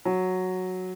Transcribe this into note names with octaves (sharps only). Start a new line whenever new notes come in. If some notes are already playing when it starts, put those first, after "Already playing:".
F#3